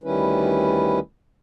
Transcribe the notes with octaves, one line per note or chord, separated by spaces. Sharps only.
D2 D#3 G3 C#4 E4 B4